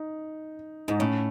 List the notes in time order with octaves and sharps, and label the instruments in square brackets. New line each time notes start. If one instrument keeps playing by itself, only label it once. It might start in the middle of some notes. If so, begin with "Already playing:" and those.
Already playing: [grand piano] D#4
[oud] G#2 [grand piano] D#4
[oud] A2 [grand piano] C#4